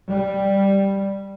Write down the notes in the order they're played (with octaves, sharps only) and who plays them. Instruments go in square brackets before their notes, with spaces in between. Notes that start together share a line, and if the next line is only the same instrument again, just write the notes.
[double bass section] G3